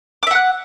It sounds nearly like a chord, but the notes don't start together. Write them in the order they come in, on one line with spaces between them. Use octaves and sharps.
D6 E5 F#5 F#6